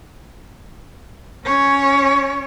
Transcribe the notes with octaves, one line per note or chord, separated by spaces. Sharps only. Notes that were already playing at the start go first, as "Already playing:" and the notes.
C#4 C#5